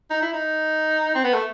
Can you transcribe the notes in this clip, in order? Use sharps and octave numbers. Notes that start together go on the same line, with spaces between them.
D#4
E4
D#4
C4
B3
A3